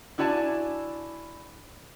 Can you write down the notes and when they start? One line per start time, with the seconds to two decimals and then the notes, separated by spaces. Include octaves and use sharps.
0.18 D4 E4 F#4 D5 G#5 A5